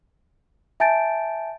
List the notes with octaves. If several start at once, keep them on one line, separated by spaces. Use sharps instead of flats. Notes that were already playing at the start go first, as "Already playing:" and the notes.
E5 G#5 A5 G6 A6 D7